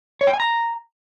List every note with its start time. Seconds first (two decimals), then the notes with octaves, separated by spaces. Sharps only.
0.21 C#5
0.27 G5
0.33 G#5
0.40 A#5